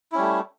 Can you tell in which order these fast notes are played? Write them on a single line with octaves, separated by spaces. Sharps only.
E4 C#4 G3 A3